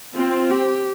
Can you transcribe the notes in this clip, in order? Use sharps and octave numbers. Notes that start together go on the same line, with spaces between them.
C4 F4
G4